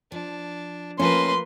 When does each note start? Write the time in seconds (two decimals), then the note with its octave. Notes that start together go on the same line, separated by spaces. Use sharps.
0.12 F3 D4
1.00 F3 A3 A#3 C#4 B4 C6